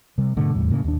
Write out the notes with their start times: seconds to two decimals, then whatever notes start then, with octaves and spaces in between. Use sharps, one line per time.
0.18 C3 G3
0.37 G#2 B2 D3 A3
0.54 F1 E2 A2 G3
0.70 A2 C#3 A#3
0.84 D#2 D4